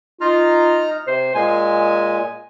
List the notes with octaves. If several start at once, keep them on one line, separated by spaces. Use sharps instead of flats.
D#4 F4 A#5 F6
C3 C5
A#2 G#3 G#5